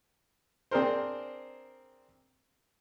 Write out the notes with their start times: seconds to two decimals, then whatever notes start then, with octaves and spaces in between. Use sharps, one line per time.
0.71 C4 D4 G#4 A#4 C5